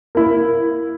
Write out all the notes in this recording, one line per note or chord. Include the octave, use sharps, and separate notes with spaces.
A#3 E4